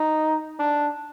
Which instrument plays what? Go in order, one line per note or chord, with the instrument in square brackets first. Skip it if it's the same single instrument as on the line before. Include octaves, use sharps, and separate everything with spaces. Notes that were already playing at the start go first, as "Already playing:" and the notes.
Already playing: [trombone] D#4
D4